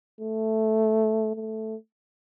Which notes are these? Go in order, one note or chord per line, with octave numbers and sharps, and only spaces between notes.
A3
A3